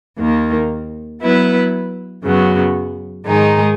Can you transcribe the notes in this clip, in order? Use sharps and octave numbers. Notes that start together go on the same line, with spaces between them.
D#2 D#3 A#3
F#3 B3 E4 B4
F#2 C#3 F#3 B3
G#2 D#3 G#3 D#4 G#4